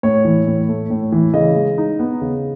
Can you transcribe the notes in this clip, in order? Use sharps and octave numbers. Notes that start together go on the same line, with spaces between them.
A2 C#5
E3
A2
A3
A2
E3
C#3 D#5
G#3
D#4
B3
C#3